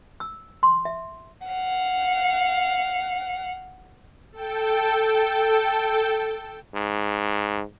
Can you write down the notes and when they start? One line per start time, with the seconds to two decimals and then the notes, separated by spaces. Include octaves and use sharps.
0.20 E6
0.63 C6
0.85 E5
1.47 F5 F#5
4.33 A4 G5
6.74 G#2